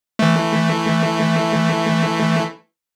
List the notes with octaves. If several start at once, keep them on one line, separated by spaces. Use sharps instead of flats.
E3 A3